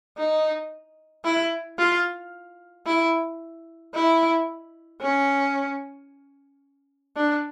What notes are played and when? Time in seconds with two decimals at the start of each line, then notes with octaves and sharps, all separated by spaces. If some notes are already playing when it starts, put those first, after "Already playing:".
0.17 D#4
1.24 E4
1.79 F4
2.86 E4
3.94 E4
5.01 C#4
7.16 D4